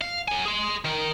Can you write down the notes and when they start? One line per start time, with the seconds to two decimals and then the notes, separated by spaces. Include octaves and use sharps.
0.01 F5
0.28 F#3 G#5
0.46 G#4 C6
0.84 D#3 A#4